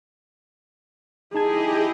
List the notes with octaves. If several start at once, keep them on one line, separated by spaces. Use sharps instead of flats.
D#4 E4 G4 G#4 D#5 A5 G#6